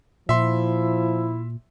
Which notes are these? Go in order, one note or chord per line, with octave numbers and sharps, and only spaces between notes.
A#2 F3 E4 E5 C6